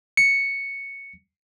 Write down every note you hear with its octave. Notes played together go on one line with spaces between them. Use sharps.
C#7